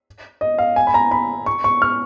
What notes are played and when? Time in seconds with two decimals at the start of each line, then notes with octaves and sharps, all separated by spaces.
0.41 D#5
0.58 F5
0.76 G#5
0.87 B5
0.94 A#5
1.11 B5
1.46 C#6
1.64 C#6
1.82 F6